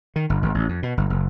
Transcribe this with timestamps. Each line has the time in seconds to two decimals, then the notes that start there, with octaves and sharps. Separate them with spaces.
0.16 D#3
0.30 G1
0.42 G#1
0.54 A1
0.69 F2
0.83 B2
0.97 G1
1.10 F#1